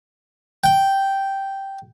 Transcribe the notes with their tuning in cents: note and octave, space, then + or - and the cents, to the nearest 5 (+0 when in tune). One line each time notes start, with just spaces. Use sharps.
G5 -5